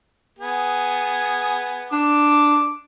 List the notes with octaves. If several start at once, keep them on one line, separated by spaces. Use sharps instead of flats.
B3 G#4
D4 D6